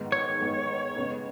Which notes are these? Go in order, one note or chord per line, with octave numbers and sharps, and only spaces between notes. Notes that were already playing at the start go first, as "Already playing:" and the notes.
Already playing: G#2 D#3 G#3 B3
C#5
G#2 D#3 G#3 B3
C#3 G#3 B3